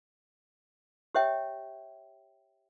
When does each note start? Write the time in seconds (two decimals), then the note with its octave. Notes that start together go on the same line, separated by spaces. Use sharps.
1.15 G4 C#5 E5 G5